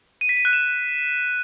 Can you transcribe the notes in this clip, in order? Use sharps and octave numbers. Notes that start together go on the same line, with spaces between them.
D#7
B6
D#7
F#6
E7